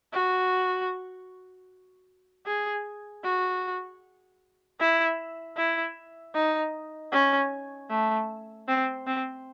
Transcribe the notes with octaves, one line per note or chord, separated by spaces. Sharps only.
F#4
G#4
F#4
E4
E4
D#4
C#4
A3
C4
C4